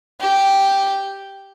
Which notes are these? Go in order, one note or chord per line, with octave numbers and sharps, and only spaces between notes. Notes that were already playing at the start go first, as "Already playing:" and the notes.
G4